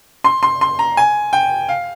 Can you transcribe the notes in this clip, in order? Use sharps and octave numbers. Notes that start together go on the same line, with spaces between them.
C6
C6
C6
A#5
G#5
G5
F5